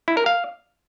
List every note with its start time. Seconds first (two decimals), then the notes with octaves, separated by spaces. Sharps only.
0.08 E4
0.17 A#4
0.26 F5